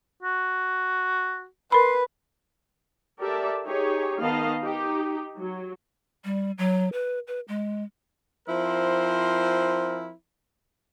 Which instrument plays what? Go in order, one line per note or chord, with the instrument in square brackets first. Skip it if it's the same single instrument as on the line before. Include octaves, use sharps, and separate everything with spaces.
[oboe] F#4
[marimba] A#4 B5 [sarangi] B4 [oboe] C6
[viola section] G4 A4 A#4 D5 E5 A5
D#4 G4 G#4 C#5
D#3 B3 D#5 F5 A5
D#4 G4
F#3
[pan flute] G3
F#3
B4
B4
G#3
[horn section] F3 C4 E4 A#4 C5